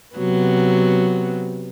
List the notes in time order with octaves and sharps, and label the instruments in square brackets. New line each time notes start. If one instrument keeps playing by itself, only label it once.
[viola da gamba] C3 F#3 B3